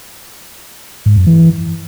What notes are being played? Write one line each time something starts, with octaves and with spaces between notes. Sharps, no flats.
G#2
F#2
E3